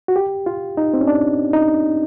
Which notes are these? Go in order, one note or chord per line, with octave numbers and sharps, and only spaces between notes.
F#4
G4
F4
D#4
C4
C#4
D4
D#4